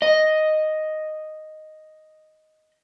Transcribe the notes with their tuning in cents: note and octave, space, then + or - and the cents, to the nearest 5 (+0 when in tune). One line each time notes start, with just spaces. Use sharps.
D#5 +0